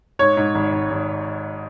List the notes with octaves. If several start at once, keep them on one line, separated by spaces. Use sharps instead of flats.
G#2 C#5
G#2
G#1
G#1
G#1